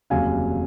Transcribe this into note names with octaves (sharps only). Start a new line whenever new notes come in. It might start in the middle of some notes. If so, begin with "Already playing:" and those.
F1 D#2 C#3 F#3 F5 G#5